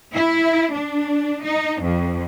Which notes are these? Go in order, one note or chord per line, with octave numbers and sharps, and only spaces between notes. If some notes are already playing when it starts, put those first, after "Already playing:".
E4
D4
D#4
F2